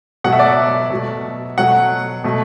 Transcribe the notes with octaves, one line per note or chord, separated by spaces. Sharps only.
B2 F#3 A3 F#5
E5
D5
E5
B2 F#3 A3
B2 F#3 A3 F#5
B2 A3